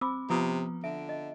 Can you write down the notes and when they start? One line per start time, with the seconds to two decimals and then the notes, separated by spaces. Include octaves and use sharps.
0.01 C4 B5 D6 E6
0.30 C3 F3 B3 F4 A#5 D#6
0.84 D3 E5 D7
1.09 D#5